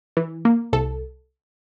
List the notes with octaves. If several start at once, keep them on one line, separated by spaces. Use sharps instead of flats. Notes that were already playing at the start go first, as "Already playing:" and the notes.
E3
A#3
C2 A4